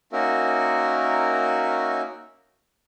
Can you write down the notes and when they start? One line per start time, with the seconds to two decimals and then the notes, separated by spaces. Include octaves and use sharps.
0.13 A#3 C#4 D#4 F#4 A#4 E5